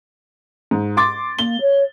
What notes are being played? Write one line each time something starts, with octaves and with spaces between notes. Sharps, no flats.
G#2
C6 D6 A6
A#3 G7
C#5